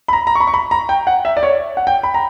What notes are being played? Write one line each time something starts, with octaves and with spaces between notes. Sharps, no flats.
B5
A#5
A#5
C#6
B5
C#6
B5
A#5
G5
F#5
E5
D5
C#5
F#5
G5
B5
A#5